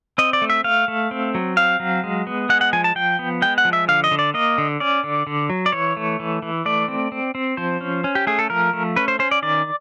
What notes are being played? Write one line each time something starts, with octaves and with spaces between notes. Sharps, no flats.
C4 D#5
D5
A3
E5
A3 F5
A3
C4
F#3
C4 F5
F#3
G#3
B3
G#3 F#5
F#5
F3 G#5
A5
F3 G5
B3
G#3 G5
F#5
F3
E5
D3 F5
D#5
D3
D5
A#3 D#5
D3
C#4 D5
D3
D3
F#3
D5
E3 C#5
A3
E3
E3
A3 D5
C4
C4
C4
F3 C5
C#4
C#4
G4
A3 G#4
A4
F3 A#4
A3
C#4 B4
C5
C#4 C5
D5
D#3 D5